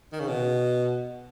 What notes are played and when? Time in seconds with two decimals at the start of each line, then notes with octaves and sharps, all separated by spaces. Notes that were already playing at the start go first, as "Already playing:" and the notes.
0.13 D#3
0.20 C#3
0.28 B2